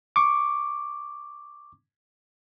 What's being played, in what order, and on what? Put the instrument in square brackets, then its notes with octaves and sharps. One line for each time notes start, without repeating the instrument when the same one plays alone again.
[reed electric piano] C#6 D6